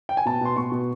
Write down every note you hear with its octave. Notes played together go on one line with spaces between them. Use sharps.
G5
G#5
B2 A5
B2 C6
B2 C#6
B2